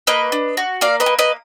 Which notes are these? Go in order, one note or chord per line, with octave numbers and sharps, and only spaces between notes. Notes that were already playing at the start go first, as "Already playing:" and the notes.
A#3 B4 D#5
D4
F#4
A#3 D5 F5
B4 D#5
A#3
B4 D#5